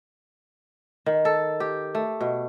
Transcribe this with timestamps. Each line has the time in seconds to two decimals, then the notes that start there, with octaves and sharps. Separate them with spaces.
1.06 D#3
1.25 A4
1.60 G4
1.95 A3
2.21 B2